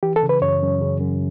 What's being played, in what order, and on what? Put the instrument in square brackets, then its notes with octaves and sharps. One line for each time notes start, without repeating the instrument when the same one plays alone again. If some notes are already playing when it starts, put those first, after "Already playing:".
[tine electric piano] E3 [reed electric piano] G4
[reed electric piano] A4
[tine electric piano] C#3
[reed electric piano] B4
[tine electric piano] F#2 [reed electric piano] C#5
[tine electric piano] F#2
C#3
F#2